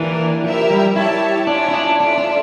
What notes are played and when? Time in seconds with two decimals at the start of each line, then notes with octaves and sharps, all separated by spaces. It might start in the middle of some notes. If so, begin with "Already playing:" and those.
Already playing: E3 A#3 D4 G4 A#4 D5
0.44 F3 E4 G4 A#4 E5
0.70 G3
0.95 E4 G4 C#5 E5 A5
1.47 C#4 D4 F4 C#5 E5
1.68 E4
1.74 D4
2.00 D4 F4 A4 E5
2.18 D4